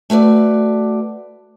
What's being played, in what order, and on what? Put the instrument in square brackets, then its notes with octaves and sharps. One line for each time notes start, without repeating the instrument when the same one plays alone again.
[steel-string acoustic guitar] A3 F#4 B4 D5